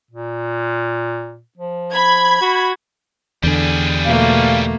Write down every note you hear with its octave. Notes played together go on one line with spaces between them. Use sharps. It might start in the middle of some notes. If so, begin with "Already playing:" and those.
A#2
F3
B5 G#6
F#4
E2 D3 G3 G#4
B2 A3 A#3 F5